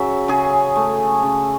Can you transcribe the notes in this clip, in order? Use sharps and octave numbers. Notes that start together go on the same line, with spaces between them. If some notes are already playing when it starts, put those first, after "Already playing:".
Already playing: C#3 F#3 E5
C#3 G#4
A3
C#3